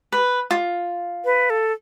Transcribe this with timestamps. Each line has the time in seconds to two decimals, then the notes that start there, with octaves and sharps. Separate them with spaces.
0.12 B4
0.51 F4
1.25 B4
1.50 A4